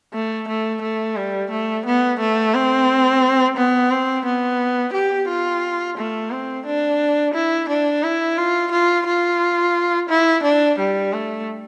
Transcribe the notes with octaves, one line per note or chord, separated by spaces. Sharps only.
A3
A3
A3
G3
A3
B3
A3
C4
B3
C4
B3
G4
F4
A3
C4
D4
E4
D4
E4
F4
F4
F4
E4
D4
G3
A3